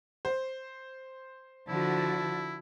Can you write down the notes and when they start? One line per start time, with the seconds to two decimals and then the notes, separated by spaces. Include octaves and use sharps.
0.25 C5
1.69 D3 F3 E4 F#4 A5